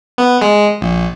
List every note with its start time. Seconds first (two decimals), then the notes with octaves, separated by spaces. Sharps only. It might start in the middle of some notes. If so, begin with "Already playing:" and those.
0.18 B3
0.42 G#3
0.81 A#1